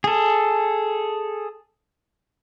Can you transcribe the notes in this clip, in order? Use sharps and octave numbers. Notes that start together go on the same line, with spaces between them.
G#4 A4